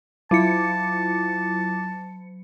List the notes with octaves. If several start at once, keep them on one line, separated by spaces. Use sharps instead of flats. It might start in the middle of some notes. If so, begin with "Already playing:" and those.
F#3 E4 F4 A5 D6 C#7